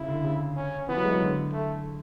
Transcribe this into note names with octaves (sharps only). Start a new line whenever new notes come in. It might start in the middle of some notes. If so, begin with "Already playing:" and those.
Already playing: C#3 E4
D3
C#3
C#4
E3 B3
F#3
G#3
F#3
D3
A3